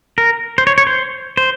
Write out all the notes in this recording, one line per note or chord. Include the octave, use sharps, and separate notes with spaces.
A#4
C5
C#5
C#5
C5
C5